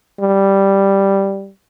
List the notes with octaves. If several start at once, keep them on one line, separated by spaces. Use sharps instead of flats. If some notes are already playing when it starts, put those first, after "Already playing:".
G3